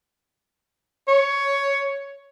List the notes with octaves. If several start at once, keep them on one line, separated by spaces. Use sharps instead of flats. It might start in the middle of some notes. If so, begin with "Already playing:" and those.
C#5